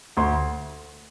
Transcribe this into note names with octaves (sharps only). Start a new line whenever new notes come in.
D2 C6